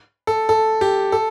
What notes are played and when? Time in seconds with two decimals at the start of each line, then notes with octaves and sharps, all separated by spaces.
0.27 A4
0.49 A4
0.81 G4
1.12 A4